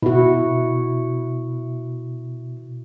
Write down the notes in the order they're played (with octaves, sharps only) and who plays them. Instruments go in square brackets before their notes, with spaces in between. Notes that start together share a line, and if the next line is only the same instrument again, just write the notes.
[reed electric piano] B2 [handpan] E4 F#4